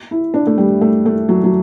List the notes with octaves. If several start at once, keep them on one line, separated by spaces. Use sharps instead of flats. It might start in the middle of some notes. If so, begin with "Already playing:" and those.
E4
D4
A3
G3
A3
A3
F#3
F#3